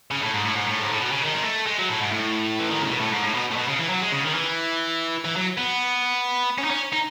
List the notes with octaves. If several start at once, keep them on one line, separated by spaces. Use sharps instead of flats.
C#3
A2
G#2
A2
G#2
A2
G#2
A2
B2
C#3
D#3
G#3
A3
G#3
F#3
A2
G#2
A2
E3
D#3
C#3
B2
A2
G#2
A2
B2
A2
B2
C#3
E3
F#3
G#3
C#3
D#3
E3
E3
F#3
B3
C#4
D#4
C#4
D#4